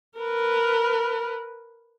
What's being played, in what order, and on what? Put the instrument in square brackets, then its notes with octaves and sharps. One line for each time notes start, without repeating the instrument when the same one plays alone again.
[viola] A#4 B4